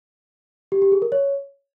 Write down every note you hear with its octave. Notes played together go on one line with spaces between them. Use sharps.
G4
G4
G#4
A#4
C#5